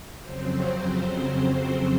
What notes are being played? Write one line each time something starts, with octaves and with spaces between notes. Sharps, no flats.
F2 C#3 F#3 C4 C5